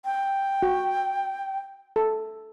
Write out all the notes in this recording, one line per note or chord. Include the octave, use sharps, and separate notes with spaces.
G5
F#4
A4